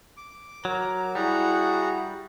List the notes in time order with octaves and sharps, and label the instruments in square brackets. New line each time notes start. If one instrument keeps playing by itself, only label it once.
[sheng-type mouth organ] D6
[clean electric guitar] F#3 [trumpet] A#4
[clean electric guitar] G3 [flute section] E4 [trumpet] F#4 [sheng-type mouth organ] G#4 F#5 A#5